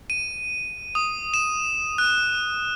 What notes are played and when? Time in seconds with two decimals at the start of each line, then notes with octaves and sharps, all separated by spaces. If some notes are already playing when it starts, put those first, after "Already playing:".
0.10 D#7
0.95 D#6
1.34 E7
1.98 F#6